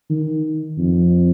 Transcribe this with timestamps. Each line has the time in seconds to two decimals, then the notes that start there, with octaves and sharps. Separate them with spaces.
0.10 D#3
0.78 F2